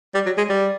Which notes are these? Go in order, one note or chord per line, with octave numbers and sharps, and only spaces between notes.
G3
F#3
G#3
G3